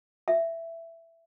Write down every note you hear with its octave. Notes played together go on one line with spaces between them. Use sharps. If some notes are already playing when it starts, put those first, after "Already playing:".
E5